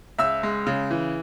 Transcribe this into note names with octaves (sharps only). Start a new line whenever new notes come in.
C#2 E5 E6
G#3
C#3
E3